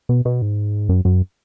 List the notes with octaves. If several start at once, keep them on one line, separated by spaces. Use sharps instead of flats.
B2
B2
G#2
F#2
F#2